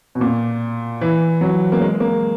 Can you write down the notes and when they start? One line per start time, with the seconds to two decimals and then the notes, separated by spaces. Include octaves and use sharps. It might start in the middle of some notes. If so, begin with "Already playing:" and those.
0.15 B2
0.21 A#2
1.01 E3
1.41 F#3
1.72 A#3
1.81 G#3
2.00 A#3